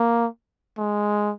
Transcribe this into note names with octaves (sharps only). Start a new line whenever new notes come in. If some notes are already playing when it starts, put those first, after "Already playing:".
Already playing: A#3
G#3